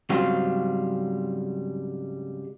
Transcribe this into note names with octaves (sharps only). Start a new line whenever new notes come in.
G#2 C#3 F#3 G3 C4 F4